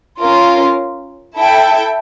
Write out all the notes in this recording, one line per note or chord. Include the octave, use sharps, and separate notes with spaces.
C#4 F4 A#4
E4 A4 E5 G5